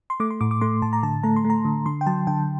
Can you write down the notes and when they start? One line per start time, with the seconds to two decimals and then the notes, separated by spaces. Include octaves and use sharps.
0.10 C6
0.20 A3 D6
0.30 C6
0.41 A2 D6
0.51 D6
0.61 A3 C6
0.82 A2 A5
0.93 A#5
1.03 D3 A5
1.23 A3 A#5
1.36 C6
1.45 A3
1.50 A#5
1.65 D3
1.86 D3 C6
2.01 G5
2.06 F#3 A5
2.27 D3 G5